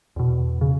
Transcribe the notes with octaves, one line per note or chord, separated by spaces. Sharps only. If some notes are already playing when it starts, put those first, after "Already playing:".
E2 B2
C#3